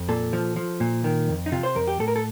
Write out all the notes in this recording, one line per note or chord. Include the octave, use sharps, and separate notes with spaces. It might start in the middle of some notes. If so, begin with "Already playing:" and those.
Already playing: F2
A#2 A4
F3
F3
A#2
D#3
F2
D#4
C3 F4
C5
F2 A#4
G4
A2 A4
A#4
A4